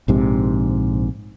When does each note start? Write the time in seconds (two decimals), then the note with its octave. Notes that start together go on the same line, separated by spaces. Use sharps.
0.08 A#1 G#2 C3